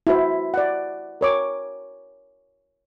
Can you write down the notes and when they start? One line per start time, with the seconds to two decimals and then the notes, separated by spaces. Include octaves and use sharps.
0.07 E4 F#4 C5
0.54 D5 F#5
1.21 A#4 C#5 D6